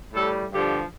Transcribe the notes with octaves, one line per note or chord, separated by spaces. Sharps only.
A2 G3 A4
G2 D3 F3 G4